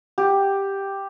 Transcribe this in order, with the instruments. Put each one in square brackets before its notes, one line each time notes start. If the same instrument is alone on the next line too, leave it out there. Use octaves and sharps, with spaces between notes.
[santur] G4